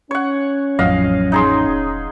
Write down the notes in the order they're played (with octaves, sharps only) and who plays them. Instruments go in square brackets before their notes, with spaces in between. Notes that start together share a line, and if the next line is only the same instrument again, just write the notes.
[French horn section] C#4 [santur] C#5 F#5
[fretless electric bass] A1 F2 [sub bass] F#3 [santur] D#5 F5 F#5
[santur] D#4 G#4 C6
[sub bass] E1